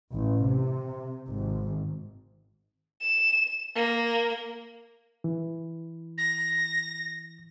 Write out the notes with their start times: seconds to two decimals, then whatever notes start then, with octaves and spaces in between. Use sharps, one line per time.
0.14 A1
0.44 C3
1.28 G#1
3.01 E7
3.75 A#3
5.24 E3
6.18 A#6